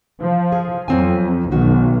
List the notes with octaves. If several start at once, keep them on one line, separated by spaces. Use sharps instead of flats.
F3
G#4
F2 F#3 C4 G#5
B1 D#3 F#4